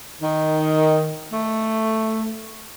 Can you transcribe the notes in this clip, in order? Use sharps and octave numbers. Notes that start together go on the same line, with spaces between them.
D#3
A3